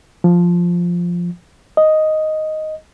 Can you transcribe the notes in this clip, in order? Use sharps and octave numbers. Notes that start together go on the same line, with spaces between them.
F3
D#5